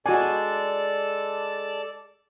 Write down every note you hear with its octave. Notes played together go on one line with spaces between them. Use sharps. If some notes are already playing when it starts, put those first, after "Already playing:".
G#3 D4 F#4 A4 D5 G#5